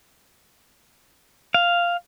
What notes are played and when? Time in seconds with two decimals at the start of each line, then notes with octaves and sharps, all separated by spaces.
1.54 F5